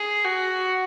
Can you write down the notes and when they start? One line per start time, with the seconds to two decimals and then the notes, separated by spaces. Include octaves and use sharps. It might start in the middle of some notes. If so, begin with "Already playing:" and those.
Already playing: G#4
0.25 F#4